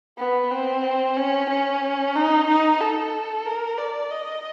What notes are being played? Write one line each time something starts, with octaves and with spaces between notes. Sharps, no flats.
B3
C4
C#4
C#4
D#4
D#4
A4
A#4
D5
D#5